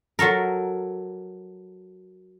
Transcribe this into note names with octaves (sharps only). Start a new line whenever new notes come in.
F#3 F#4 A4 A#4